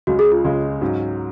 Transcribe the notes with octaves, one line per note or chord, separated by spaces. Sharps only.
C#2 C#3 G#3 C#4 F#4
G#4
F4
C#2 C#3 G#3 C#4
G#2 F#3 C#4